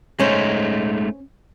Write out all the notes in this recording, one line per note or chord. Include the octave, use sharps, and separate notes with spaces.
G#3 A3 C#4 D#4 C5